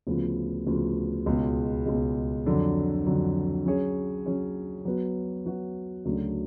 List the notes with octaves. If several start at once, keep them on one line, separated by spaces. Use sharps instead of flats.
D2 C#3 F3 B3 F4
D2 C#3 F3 B3 F4
C#2 B2 G#3
C#2 B2 G#3
F2 D3 F#3
F2 D3 F#3
F#3 C#4 G#4 C#5
F#3 C#4 G#4 C#5
F#3 B3 F#4 B4
F#3 B3 F#4 B4
D2 C#3 F#3 A3 D4